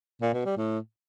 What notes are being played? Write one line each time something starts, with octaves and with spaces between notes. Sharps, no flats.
A#2
B2
G3
A2